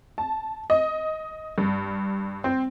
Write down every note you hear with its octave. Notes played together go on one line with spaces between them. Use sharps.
A5
D#5
G2
C4